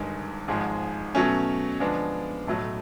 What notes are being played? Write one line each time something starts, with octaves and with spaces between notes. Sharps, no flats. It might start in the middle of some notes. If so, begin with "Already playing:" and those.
Already playing: G1 G2 D#3 G#3
G#1 G#2 F3 G#3
B2 F#3 A3 C#4
D3 F3 G#3 B3 D4
B1 A2 F#3 A3